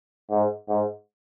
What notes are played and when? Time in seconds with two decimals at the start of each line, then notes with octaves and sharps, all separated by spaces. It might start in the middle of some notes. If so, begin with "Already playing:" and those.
0.31 G#2
0.69 G#2